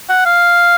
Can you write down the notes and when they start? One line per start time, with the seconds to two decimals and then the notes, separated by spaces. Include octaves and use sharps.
0.09 F#5
0.25 F5